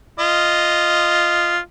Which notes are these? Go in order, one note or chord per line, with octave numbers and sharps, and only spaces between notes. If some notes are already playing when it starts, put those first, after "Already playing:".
F4 D#5